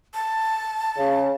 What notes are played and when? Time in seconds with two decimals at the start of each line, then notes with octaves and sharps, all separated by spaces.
0.14 A5
0.97 C#3